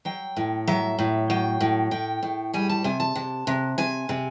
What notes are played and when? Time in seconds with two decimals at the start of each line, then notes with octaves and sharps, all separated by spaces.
0.05 F#3 G5
0.37 A2
0.68 F#3 E5
0.99 A2
1.30 F#3 G5
1.61 A2
1.91 A2 G5
2.23 A2
2.54 G3 G#5
2.69 A5
2.84 C3 G#5
3.00 A5
3.15 C3
3.47 C3
3.78 C3 G#5
4.09 C3